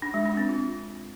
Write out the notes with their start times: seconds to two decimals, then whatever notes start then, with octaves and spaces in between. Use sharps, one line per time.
0.02 D4
0.14 G#3
0.26 D4
0.37 C4
0.49 F4